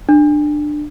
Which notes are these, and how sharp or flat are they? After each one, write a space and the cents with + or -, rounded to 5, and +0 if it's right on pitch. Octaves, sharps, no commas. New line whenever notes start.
D4 +20